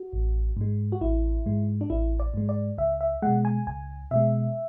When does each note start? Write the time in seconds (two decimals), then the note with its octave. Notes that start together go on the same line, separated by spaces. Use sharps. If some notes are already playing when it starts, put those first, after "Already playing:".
Already playing: F#4
0.13 A1
0.57 G#2 G#3
0.92 F#4
1.01 A1 E4
1.46 G#2 G#3
1.81 D4
1.90 A1 E4
2.20 D5
2.34 G#2 G#3
2.49 D5
2.78 C#2 E5
3.01 E5
3.22 B2 G#3 F#5
3.45 G#5
3.67 C#2 G#5
4.11 B2 G#3 E5